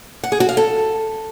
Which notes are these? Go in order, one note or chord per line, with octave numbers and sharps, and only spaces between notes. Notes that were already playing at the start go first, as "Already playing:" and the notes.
F#5
G#4
F#4
F5
A4